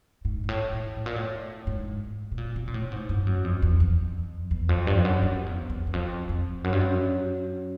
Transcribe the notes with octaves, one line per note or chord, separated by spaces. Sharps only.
G#2
G#2
A2
A2
A2
A#2
A2
G#2
B2
A#2
C3
A#2
A2
G#2
G2
F#2
F2
E2
F2
E2
F2
G2
F2
F#2
F2
E2
E2
E2
F2
F2
F#2
G2
F#2